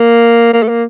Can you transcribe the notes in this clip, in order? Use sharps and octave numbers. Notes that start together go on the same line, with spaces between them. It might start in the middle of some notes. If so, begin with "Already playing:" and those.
Already playing: A#3
A#3
A3
A#3